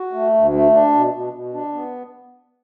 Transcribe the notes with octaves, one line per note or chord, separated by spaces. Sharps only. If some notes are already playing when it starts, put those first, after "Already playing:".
Already playing: F#4
A3
D2
A3
D4
B2
B2
B2
D4
B3